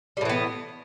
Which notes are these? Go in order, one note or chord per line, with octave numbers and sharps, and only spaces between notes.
A2 E3 G3 B3